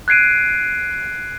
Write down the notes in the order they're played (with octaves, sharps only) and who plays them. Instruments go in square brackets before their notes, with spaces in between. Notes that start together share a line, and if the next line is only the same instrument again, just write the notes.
[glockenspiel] F#6 G#6 C7 D7 D#7